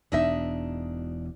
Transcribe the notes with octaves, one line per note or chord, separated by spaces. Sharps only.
E1 E2 B2 D4 D#4 E5